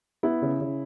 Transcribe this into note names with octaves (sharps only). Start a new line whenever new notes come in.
B3 E4
C#3
C#3